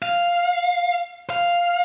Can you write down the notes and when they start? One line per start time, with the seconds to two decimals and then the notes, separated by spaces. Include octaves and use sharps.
0.02 F5
1.30 F5